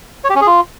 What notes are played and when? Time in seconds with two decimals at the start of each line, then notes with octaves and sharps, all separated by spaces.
0.24 C#5
0.30 G4
0.36 C#4
0.41 G#4
0.47 F4